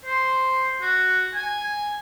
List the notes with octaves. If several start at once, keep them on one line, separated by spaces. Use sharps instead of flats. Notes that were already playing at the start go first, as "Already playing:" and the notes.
C5
F#4
G#5